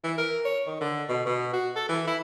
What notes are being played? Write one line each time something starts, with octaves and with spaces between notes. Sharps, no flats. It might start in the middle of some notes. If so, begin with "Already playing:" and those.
E3
A#4
C#5
D#3
D3
B2
B2
F#4
A4
E3
E4